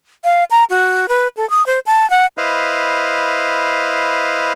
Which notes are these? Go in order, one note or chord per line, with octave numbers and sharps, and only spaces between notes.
F5
A#5
F#4
B4
A4
D#6
C5
A5
F#5
E4 B4 C5 D#5 F5